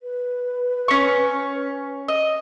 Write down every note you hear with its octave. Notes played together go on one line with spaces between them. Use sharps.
B4
C#4 C#6
D#5